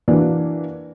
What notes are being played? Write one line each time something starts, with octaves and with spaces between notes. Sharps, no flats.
E3 A#3 D4 F#4